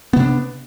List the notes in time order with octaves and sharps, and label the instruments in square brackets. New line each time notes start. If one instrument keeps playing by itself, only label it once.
[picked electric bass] B3
C3
D4